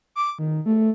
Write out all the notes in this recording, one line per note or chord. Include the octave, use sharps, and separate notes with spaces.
D6
D#3
A3